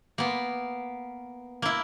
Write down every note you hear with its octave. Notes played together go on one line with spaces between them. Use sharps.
A#3 B3
A#3 E4